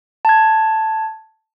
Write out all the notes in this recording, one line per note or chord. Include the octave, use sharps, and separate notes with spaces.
A5 G#6